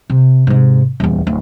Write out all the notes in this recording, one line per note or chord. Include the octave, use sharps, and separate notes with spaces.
C3
G#2 C3
D#1 E2
D1